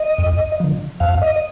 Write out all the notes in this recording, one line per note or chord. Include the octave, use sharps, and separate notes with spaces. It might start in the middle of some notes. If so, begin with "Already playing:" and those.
Already playing: D#5
F2
D3 F3
F2 F5
D#5